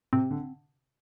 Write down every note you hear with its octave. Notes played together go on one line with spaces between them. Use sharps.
C3 C4
D3